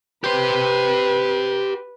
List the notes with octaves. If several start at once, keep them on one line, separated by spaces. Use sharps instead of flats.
G4 B4 C5